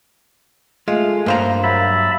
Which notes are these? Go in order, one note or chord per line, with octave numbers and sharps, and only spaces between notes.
G#3 A3 F4
G2 A#3 C5 F5 A#5
F#3 E5 A5 B5